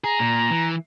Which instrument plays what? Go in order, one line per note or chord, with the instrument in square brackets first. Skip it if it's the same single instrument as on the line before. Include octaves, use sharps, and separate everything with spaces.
[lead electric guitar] G#4 [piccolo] A#5
[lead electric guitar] A#2
E3